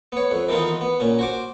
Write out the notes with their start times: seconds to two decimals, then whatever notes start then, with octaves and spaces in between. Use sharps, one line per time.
0.12 B3 C#5
0.31 F2
0.48 D#3 E3 B3 D#4 F4
0.81 B3
1.00 A#2 C#4
1.19 F#4 C5 D6